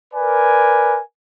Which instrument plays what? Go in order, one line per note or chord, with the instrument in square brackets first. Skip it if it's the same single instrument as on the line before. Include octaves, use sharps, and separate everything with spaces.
[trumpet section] A#4 B4 D5 G#5